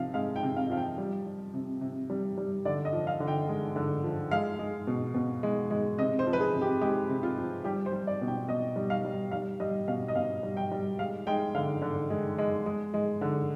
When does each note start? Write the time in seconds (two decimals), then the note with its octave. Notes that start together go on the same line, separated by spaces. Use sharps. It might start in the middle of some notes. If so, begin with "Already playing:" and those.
Already playing: C3 F3 F5
0.14 G#3 F5
0.36 G5
0.43 C3
0.57 F5
0.70 F3 F5
0.77 G5
0.98 G3
1.26 G3
1.54 C3
1.81 C3
2.10 G3
2.38 G3
2.65 D3 D5
2.85 D#5
2.93 F3
3.07 F5
3.20 D3
3.28 G5
3.49 G#3
3.76 D3
4.04 F3
4.31 G#3 F5
4.59 G#3
4.87 B2
5.14 B2
5.43 G#3
5.70 G#3
5.98 C3 D#5
6.19 C5
6.27 F3
6.33 B4
6.40 G#4
6.54 C3
6.62 G4
6.81 G#3 G4
7.09 C3
7.23 F4
7.38 F3
7.65 G3 G4
7.86 C5
7.93 G3
8.07 D5
8.21 B2
8.28 G5
8.48 B2 D#5
8.76 G3
8.90 F5
9.05 G3
9.31 G3 F5
9.60 G3 D#5
9.88 B2 F5
10.08 D#5
10.15 B2 F5
10.43 G3
10.57 G5
10.71 G3
10.98 G#3 F5
11.27 G#3 G5
11.55 D3 F5
11.82 D3
12.10 G#3
12.38 G#3
12.66 G#3
12.94 G#3
13.21 D3